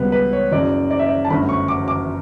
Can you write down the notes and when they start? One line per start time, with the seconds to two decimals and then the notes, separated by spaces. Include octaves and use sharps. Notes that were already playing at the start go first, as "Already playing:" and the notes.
Already playing: C#2 C#3 G3 B3 B4
0.12 B4
0.33 C#5
0.52 F#1 F#2 C#3 D5
0.91 D5
0.99 E5
1.06 D5
1.25 A5
1.30 G1 F#2 D3 A3 B5
1.49 C#6
1.68 D6
1.88 D6